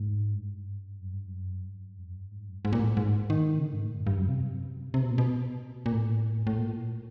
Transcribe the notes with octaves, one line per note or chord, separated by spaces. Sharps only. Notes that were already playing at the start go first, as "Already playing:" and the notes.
Already playing: G#2
G2
F#2
G2
F#2
G2
F2
F#2
G2
G#2
F#2
G2
G#2
A#2
A2
G#2
D#3
C#3
D3
G#2
A2
G2
G2
F#2
C3
C3
B2
A#2
B2
A#2
A2
A2
A#2